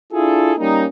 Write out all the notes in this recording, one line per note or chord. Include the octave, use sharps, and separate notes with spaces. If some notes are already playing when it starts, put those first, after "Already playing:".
D4 E4 F4 G#4 A4
G3 A#3 C#4 D#4